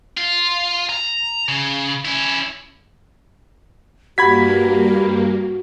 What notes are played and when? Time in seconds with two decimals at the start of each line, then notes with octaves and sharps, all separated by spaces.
0.18 F4
0.90 A#5
1.49 C#3
2.05 C#4 E4
4.18 G2 A#3 F#4 G4 B5 G#6 B6